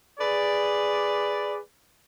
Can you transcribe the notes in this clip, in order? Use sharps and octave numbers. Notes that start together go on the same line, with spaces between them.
G#4 B4 D5